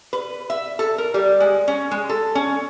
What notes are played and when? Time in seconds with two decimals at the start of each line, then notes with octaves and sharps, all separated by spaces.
0.13 B4
0.50 E5
0.79 A4
0.98 A#4
1.14 G3
1.40 G#3
1.68 C#4
1.91 G#3
2.09 A4
2.35 C#4